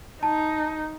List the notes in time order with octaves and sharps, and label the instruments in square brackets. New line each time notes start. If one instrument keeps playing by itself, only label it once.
[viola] D#4 [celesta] A5